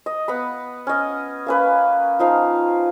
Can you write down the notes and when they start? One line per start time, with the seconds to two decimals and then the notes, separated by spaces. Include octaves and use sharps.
0.06 D#5
0.28 B3 F#5 B5
0.87 C#4 D#5
1.46 A#3 C#4 B4
2.19 F3 D#4 F5